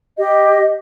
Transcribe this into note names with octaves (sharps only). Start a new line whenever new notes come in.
G4 D#5